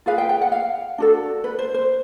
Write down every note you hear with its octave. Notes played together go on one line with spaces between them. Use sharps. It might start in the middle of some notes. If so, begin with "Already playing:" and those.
F4 G#4 B4 F5
G5
G5
F#5
F5
D4 F#4 A4
B4
C5
C5